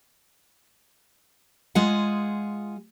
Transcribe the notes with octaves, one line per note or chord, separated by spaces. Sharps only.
G#3 F4 G#4 F#5